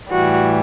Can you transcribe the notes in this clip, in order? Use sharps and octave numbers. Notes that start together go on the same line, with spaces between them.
A2 E3 G3 F#4